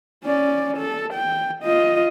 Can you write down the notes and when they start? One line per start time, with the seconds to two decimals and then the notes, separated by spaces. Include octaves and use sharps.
0.24 C#4 D5
0.77 A4
1.14 G5
1.63 F4 D#5